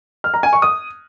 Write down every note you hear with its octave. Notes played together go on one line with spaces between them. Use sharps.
F6
A#5
G#5
C#6
D#6